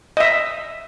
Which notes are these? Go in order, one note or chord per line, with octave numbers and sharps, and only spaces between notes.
D#5 E5